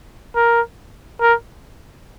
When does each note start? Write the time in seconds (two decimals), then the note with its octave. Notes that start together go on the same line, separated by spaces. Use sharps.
0.35 A#4
1.21 A#4